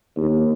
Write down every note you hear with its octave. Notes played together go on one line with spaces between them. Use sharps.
D#2